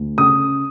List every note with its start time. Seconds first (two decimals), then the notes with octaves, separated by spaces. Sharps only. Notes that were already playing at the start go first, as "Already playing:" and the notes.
Already playing: D2
0.18 C#3 D#6